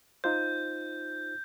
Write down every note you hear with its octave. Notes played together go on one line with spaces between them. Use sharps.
D#4 F4 C5 G6